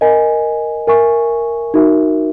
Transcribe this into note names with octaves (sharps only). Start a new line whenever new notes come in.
A#4 D#5 G#5
A#4 E5 G#5 C#6
D#4 F#4 A#4 E5